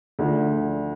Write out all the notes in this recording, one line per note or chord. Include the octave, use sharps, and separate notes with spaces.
D2 D3 F3